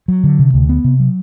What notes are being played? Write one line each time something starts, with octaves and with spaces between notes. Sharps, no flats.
F#3
D3
C3
D2
B3
C3
F#3